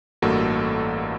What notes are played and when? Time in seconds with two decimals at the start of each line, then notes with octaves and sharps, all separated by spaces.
0.22 A1 G2 A#3 F#4 A4